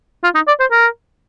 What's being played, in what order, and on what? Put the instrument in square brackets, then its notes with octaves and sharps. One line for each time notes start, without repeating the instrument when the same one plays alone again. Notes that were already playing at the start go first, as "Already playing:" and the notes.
[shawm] F4
D#4
D5
C5
A#4